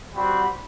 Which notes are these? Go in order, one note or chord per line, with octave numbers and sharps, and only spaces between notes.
G3 C4 F#4 B5